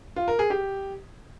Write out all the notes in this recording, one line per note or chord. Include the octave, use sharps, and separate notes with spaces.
F4
A#4
G#4
G4